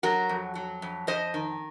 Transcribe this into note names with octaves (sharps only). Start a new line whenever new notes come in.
F#3 F#4 A#4
F2
F#3
F2
F2 C5 D#5
D#3